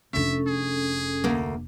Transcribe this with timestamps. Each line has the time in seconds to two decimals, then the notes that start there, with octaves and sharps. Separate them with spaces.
0.13 F1 C#4 D4 A4 E5
0.48 G#4
1.24 D2 A#3